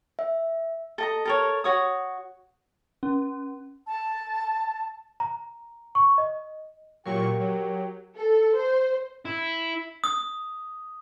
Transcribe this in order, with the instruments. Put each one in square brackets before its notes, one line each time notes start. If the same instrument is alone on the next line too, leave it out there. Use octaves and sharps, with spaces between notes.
[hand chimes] E5
[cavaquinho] A4 D#5 A#5
A4 A#4 C#5
F#4 C#5 D#6
[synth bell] C#4
[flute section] A5
[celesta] A#5
C#6
D#5
[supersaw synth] A#2 F#3 C#6 [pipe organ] G4 [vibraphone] A#4
[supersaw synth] F#3
[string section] A4
C5
[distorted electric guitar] E4
[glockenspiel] D#6